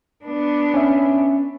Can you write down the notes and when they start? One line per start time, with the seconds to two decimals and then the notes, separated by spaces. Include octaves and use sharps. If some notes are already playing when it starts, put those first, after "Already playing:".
0.25 B3 D4
0.74 C#4 E5